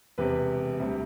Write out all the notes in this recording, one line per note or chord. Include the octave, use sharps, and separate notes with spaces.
E1 E2 C3 G4 B4
D2 C3 G3